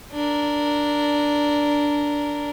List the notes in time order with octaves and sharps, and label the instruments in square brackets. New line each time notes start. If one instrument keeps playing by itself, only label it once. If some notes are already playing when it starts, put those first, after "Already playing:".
[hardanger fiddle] D4 A#4